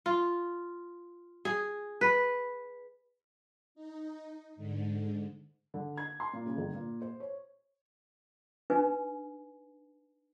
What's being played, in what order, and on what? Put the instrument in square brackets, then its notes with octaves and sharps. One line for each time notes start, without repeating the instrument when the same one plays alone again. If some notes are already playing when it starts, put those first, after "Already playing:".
[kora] F4
G#4
B4
[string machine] D#4
G#2 D3
[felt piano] D3
G#6
C6
A#2
C#3
G1
A#2
C5
C#5
[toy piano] D4 D#4 B4 G#5